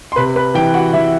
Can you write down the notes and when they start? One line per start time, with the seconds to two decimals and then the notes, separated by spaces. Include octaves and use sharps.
0.12 C6
0.16 C3 B4 B5
0.36 B4 B5
0.54 E3 G4 G5
0.74 F#4 F#5
0.93 E3 E4 E5